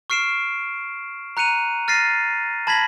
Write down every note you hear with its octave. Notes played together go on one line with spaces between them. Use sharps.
C#6 F6 C7 D7 E7
A#5 F#6 C#7 D#7 F7
F6 A6 A#6 C7 D#7
A5 B5 G#6 A#6 B6 F#7